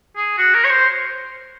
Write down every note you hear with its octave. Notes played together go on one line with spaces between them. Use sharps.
G#4
F#4
A#4
C#5
C5